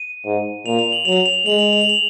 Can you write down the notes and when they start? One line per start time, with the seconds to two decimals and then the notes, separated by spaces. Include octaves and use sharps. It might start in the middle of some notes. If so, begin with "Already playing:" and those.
Already playing: D#7
0.25 G#2
0.66 A#2 F7
0.79 F7
0.92 F#7
1.05 F#3 F7
1.26 F7
1.46 G#3 F#7
1.59 F7
1.73 F7
1.81 F#7
1.89 F7